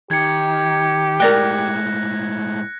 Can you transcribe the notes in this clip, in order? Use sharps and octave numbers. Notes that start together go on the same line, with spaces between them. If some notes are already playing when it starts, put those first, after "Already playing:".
D#3 G4 G#6 C#7
A2 G#3 A#4 D5 G5 F#6 A#6